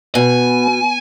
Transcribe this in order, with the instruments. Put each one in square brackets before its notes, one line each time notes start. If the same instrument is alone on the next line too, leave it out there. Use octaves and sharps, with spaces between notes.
[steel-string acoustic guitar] B2 [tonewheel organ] B3 [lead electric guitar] G#5